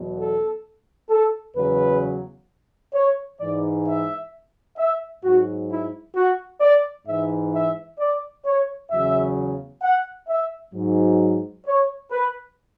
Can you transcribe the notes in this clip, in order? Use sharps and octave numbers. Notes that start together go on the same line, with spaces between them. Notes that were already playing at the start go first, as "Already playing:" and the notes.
Already playing: E2 B2 F#3
A4
A4
E2 C#3 F#3 B4
C#5
G#2 E3 D5
E5
E5
G#2 F#3 F#4
E4
F#4
D5
G#2 E3 E5
E5
D5
C#5
E2 C#3 F#3 E5
F#5
E5
G#2 F#3
C#5
B4